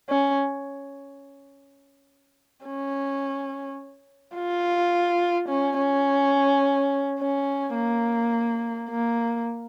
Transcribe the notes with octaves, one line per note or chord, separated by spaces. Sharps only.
C#4
C#4
F4
C#4
C#4
C#4
A#3
A#3